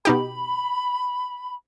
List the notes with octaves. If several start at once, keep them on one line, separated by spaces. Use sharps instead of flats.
B2 D#4 G4 B5